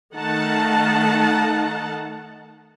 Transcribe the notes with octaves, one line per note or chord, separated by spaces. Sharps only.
D#3 A3 D#4 F#5 A5